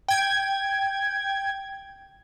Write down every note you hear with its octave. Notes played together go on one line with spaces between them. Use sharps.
G5 G#6